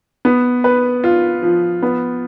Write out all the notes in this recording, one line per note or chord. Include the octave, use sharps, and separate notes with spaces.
B3
B4
F4
F3
B3